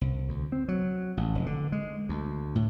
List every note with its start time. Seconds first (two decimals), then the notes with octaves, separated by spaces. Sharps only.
0.01 C2
0.29 D2
0.52 C4
0.68 F#3
1.17 A1
1.35 F1
1.46 D3
1.72 G#3
2.09 D2
2.55 A2